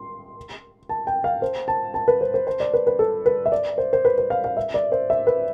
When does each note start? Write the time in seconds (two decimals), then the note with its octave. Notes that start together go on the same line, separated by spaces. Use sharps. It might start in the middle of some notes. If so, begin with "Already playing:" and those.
Already playing: C6
0.89 A5
1.07 G5
1.24 F5
1.42 C5
1.68 A5
1.94 A5
2.08 B4
2.21 C5
2.34 C5
2.47 C5
2.60 D5
2.74 B4
2.87 B4
2.99 A4
3.26 B4
3.46 E5
3.52 D5
3.78 C5
3.93 C5
4.05 B4
4.18 B4
4.30 F5
4.44 F5
4.57 E5
4.74 D5
4.92 C5
5.10 E5
5.27 B4